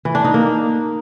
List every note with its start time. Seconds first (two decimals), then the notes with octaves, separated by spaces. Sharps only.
0.05 E3
0.15 D4
0.24 D#4
0.34 A#3